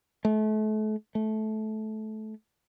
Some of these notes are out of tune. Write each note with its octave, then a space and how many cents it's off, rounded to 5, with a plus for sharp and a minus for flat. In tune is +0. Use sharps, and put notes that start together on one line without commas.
A3 -35
A3 -20